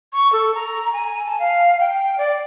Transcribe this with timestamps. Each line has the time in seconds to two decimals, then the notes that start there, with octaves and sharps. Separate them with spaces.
0.13 C#6
0.33 A4
0.55 A#5
0.93 G#5
1.26 A5
1.39 F5
1.80 G5
2.18 D5